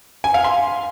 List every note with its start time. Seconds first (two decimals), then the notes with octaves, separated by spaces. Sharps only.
0.24 G#5
0.34 F5
0.44 C6